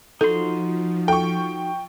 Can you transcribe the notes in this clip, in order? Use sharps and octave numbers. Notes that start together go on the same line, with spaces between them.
F3 D#4 F#4 A4 C6
A4 G5 C#6